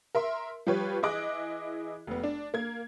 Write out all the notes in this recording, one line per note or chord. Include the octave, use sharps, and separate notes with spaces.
A#4 E5 C6
F3 G3 G4 B4 C#5
E3 E4 G#4 D#5 D6 F#6
F1 B3
D4
A#3 G#6